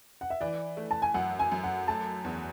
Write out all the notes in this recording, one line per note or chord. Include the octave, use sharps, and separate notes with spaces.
F#5
E5
E3 D5
A3
A5
G#5
F#2 F#5
G#5
F#2
F#5
A3 A5
E2